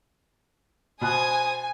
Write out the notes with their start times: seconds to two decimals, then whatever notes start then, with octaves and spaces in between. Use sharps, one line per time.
1.01 B2 C5 G#5 D#6 F#6